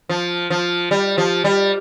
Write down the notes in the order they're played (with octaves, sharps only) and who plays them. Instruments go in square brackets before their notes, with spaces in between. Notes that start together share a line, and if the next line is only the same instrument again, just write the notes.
[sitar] F3
F3
G3
F3
G3